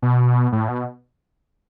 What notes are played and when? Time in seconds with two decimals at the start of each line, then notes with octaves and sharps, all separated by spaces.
0.02 B2
0.52 A2
0.69 B2